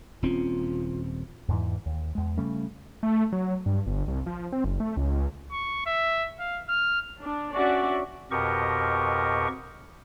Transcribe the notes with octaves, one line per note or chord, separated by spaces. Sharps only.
D#1 C4 C#4 F4
E2 G#2 E3
D#2
E2 G#3
C#3 G3 A3 C#4
A3
F#3
G2
G1
C2
F3
C4
F#1
A3
C#2
C#6
E5
F5
F6
D4
C#4 D4 F#4 D5 E5 F#5
F2 B2 G4 A#4 D#5 C#6